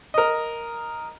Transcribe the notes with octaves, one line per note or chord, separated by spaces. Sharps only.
A#4 D#5